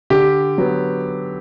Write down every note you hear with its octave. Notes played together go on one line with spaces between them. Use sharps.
D3 G4
F#3 B3